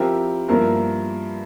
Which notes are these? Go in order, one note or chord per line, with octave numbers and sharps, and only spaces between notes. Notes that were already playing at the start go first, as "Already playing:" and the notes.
Already playing: F3 C4 E4 G4 A#4
G2 F3 A#3 E4 A#4